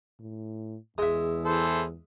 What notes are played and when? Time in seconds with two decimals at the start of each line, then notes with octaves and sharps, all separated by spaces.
0.20 A2
0.98 E2 G#3 E5
1.45 E3 A4 C5